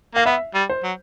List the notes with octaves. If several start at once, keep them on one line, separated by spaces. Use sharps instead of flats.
A#3 F5
B3 E5
G3
C5
F#3